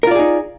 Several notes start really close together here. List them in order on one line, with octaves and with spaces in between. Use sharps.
A#4 F4 D5 G#4 D#4